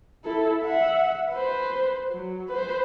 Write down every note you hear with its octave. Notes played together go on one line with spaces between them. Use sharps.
E4 A4
E5 F#5
B4 C5
F#3
B4 C5